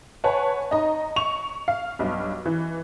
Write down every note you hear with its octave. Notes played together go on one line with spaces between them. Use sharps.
B4 C#5 F#5 G#5 A5
D#4 D#5 A#5
C#6 F7
F5
B1 G2
E3